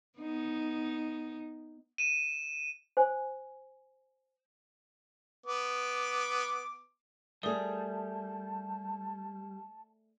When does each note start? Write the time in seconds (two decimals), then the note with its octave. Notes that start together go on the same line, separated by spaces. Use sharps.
0.19 B3 D#4
1.98 D#7 E7
2.97 C5 G#5
5.46 B3 D6
7.43 G3 A3 G#4 A#4 D5 A5 D#6